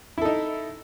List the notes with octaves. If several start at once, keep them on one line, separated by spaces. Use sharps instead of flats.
D#4 E4 A4